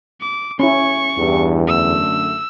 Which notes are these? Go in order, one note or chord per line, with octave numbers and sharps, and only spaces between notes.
D6
C#4 E4 C#6
E2 G2 E3 G4
F#2 D3 A3 E6